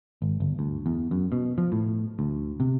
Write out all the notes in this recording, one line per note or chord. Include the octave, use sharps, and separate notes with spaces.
G#1
G1
D2
E2
F#2
B2
F3
A2
D2
C3